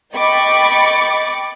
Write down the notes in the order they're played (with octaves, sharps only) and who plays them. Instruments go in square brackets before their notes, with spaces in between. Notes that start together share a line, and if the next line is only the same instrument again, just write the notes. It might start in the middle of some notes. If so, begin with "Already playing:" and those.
[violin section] D#5 G5 B5 C#6 D6 A6